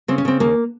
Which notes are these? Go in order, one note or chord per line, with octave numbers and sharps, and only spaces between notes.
C#3 C4
C#4
C#3 C4
D#2 A#3